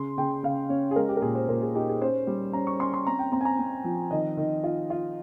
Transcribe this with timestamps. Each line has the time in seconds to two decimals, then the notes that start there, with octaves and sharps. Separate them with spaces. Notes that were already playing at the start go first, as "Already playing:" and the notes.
Already playing: C#3 C6
0.17 C#3 G5
0.43 C#3 F5
0.69 C#4 C#5
0.91 G#4
0.96 G#3 A#4
1.09 G4
1.17 A#4
1.22 A#2 G#4
1.35 C5
1.48 A#2 A#4
1.62 G#4
1.75 D#4 G4
1.89 G#4
2.01 C#4 C5
2.27 G3
2.53 C#4 A#5
2.67 C#6
2.80 C#4 C6
2.94 C6
3.07 C4 A#5
3.19 G5
3.32 C4 A#5
3.41 G#5
3.45 A#5
3.59 C4
3.84 F3
4.11 D#3 D#5
4.37 D#3
4.64 F4
4.90 F4